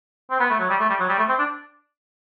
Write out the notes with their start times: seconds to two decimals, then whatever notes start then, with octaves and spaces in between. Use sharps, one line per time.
0.31 C4
0.40 B3
0.50 A3
0.59 F#3
0.70 G3
0.80 A3
0.90 G3
1.00 F#3
1.09 G3
1.18 A3
1.29 C4
1.39 D4